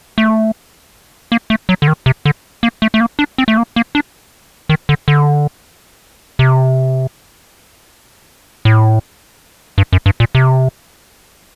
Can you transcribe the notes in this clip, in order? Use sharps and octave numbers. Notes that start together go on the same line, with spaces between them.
A3
A#3
A3
F#3
D3
D#3
C3
D3
A#3
A3
A3
A#3
D4
C4
A3
A#3
A#3
D4
D#3
D3
D3
C3
A2
G2
F#2
G2
A#2
C3